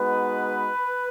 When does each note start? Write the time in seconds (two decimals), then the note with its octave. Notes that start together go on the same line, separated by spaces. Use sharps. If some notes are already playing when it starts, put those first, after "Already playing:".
Already playing: G#3 B3 D#4 F#4 B4